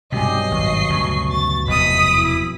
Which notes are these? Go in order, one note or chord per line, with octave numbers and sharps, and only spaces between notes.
B1 G2 C3 G#3 G4 D#5 G#5 C7
G#1 C#6
D2 C#3
A6
F1 E2 D#5 B5 D#6
E4